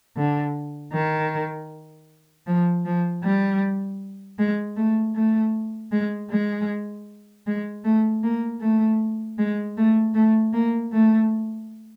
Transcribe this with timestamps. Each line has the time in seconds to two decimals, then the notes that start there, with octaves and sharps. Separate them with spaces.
0.17 D3
0.93 D#3
2.47 F3
2.85 F3
3.23 G3
4.39 G#3
4.76 A3
5.15 A3
5.92 G#3
6.30 G#3
7.47 G#3
7.84 A3
8.23 A#3
8.61 A3
9.38 G#3
9.77 A3
10.14 A3
10.53 A#3
10.93 A3